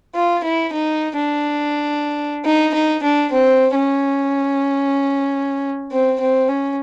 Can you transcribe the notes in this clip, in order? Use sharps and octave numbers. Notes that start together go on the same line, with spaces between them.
F4
E4
D#4
D4
D#4
D#4
D4
C4
C#4
C4
C4
C#4